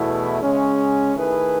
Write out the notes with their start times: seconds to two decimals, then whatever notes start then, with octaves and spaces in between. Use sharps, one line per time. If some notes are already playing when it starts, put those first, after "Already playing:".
Already playing: E2 B2 A3 E4
0.42 C#3 G#3 C#4
1.16 D#3 A3 E4 G#4 B4